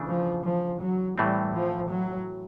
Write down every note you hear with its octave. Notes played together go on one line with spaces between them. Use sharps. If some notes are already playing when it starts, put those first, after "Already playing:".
Already playing: C#3 E3 A3 D4
F3
F3
F#3
A2 E3 G3 A3 C4
F3
F#3